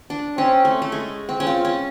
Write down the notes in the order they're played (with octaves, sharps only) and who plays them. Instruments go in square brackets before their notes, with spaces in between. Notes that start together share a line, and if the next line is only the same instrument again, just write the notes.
[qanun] D4
[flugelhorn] C4 [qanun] C#4
[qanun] A3
A3
G#3
C4
C#4
[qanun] C4 [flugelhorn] F4
[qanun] C#4